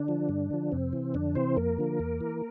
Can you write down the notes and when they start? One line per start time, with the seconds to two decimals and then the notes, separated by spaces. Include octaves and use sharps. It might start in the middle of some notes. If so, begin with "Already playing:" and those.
Already playing: D3 D4
0.08 F3
0.29 G2
0.51 D3 F3
0.72 F2 C3 C4
0.93 E3
1.14 F2 D3 D4
1.35 C3 E3 C4 C5
1.56 F2 A#3 A#4
1.78 D3 F3
1.99 E2
2.21 E3